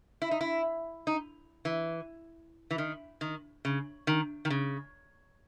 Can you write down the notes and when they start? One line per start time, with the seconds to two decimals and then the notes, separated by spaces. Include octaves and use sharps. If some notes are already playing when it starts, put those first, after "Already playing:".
0.22 E4
0.31 D#4
0.41 E4
1.07 D#4
1.65 E3
2.71 E3
2.78 D#3
3.21 D#3
3.65 C#3
4.07 D#3
4.45 D#3
4.50 C#3